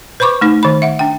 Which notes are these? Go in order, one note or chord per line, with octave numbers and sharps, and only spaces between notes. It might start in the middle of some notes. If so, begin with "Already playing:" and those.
B4 C5 B5 C#6 D6
A3 D#4
D#3 B5
E5 F#5
D4 G5